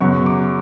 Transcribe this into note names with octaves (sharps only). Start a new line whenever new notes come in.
F#2 C#3 F#3 B3 C#6
D6